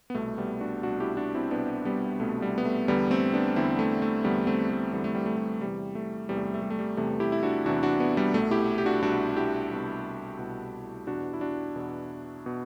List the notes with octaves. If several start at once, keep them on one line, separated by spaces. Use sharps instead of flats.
B3
C2 B2 A3
G3 B3
D4 F#4
C2 B2 D4 F#4
E4 G4
D4 F#4
C4 E4
C2 B2 B3 D4
G3 B3
C2 B2 A3
G3
B3
A3
E2 D3 G3 B3
A3 C4
B3 D4
E2 D3 C4 E4
A3
A3
E2 D3 G3 B3
A3 C4
A3
E2 D3 G3
A3
G3
A3
G3
E2 C3 E3 G3
A3
E2 C3 E3 G3
A3
G3
A3
G3
A3
G3
E2 C3 E3 A3
E4 G4
E4
D4 F#4
E2 C3 E3 D4 F#4
D4 F#4
B3 D4
G3 B3
C2 B2 A3
E4 G4
G4
D4 F#4
C2 B2 D4 F#4
E4 G4
C2 B2
C2 B2
E2 B2 D4 F#4
E4
D4 F#4
E2 B2
B2